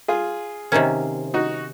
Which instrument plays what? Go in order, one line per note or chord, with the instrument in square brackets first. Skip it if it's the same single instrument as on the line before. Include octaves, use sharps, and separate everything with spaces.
[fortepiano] F4 G#4
[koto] C3 D#3 A#3 C#4
[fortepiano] D#4 F#4